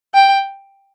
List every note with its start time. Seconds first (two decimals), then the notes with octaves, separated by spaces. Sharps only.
0.14 G5